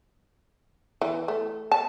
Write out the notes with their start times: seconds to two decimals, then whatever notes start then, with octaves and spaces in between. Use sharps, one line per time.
1.02 E3
1.28 A3
1.72 A5